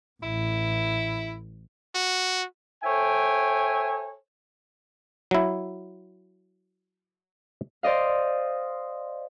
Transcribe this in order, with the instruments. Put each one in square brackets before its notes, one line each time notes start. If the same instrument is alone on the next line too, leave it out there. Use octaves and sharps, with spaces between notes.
[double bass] A1 A2 [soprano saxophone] E4
[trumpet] F#4
[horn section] A4 C5 C#5 E5 G5 G#5
[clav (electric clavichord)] F#3 E4
[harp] C5 D5 D#5 F5